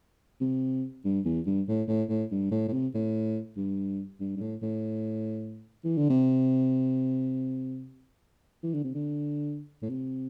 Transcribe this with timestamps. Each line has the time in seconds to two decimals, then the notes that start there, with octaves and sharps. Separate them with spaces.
0.41 C3
1.05 G2
1.25 E2
1.46 G2
1.68 A2
1.88 A2
2.09 A2
2.31 G2
2.51 A2
2.68 A2
2.72 C3
2.94 A2
3.57 G2
4.20 G2
4.36 G2
4.41 A2
4.63 A2
5.84 E3
5.97 D3
6.10 C3
8.63 E3
8.74 D3
8.84 C3
8.94 D3
9.82 A2
9.90 C3